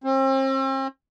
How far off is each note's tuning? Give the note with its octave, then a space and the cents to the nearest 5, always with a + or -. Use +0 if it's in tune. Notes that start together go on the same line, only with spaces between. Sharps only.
C4 +40